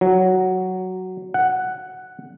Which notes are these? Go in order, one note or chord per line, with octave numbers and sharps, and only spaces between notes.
F#3
F#5